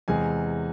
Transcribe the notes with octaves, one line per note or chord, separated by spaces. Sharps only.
E2 C3 G#3 G#5